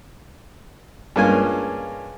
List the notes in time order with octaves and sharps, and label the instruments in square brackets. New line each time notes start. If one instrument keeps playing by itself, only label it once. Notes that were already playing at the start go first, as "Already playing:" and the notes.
[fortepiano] G2 G#3 A#3 C#4 F4 G#5